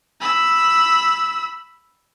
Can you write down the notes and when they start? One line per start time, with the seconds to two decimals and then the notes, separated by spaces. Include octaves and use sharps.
0.21 B5 E6